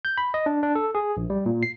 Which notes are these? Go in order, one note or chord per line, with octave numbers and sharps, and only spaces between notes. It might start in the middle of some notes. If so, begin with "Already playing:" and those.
G6
B5
D#5
D4
D4
A4
G#4
A#1
G3
A#2
C7